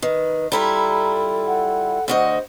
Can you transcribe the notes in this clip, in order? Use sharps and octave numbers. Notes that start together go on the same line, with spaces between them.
D#3 B4
G3 E4 F4 A4 A#5
F#5
D2 F#4 C5 D#5